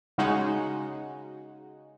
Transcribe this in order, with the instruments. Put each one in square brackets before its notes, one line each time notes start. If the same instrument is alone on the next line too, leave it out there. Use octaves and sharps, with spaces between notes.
[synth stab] C#3 G#3 D#4 F#4